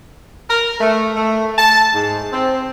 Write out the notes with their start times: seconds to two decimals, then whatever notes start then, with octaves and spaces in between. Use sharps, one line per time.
0.50 A#4
0.80 A3
1.15 A3
1.57 A5
1.93 G#2
2.32 C4